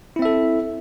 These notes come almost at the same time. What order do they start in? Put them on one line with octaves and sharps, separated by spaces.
E4 C4 E5 A4